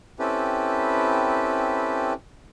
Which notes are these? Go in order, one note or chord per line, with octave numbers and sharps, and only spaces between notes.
C4 C#4 E4 G4 A4 B4